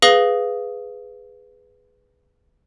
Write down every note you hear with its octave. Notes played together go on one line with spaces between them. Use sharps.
G#4 B4 F5 D#6 A#6 G7